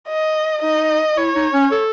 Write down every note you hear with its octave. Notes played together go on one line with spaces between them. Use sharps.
D#5
D#4 D#5
E4 C#5
D#4
C#4
A4